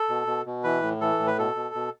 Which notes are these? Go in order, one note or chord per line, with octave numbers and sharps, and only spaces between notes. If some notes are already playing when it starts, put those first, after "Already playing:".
Already playing: A4
B2
B2
B2
E3 B4
A2
E3 A4
A2
B4
B2 A4
B2
B2